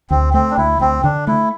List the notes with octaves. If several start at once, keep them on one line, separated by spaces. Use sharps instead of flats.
D2 C4
A3 C4
D4
D2 E4
D2 C4
D3 D4
A3 E4